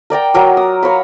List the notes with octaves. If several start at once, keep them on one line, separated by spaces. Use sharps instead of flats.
A#4 D5 G5 A#5
F#3 A#4 D6
D#6
A#4 C#5 F5 B5